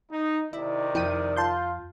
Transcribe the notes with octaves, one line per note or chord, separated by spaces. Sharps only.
D#4
C3 D#3 E4 D5
F2 E4 G5 D#7
F4 A5 C6 G6